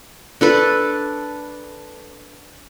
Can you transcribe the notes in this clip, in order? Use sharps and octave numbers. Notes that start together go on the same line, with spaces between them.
D4 A4 B4